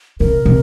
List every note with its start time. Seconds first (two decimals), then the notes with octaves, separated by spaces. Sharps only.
0.20 C3 A#4
0.45 C3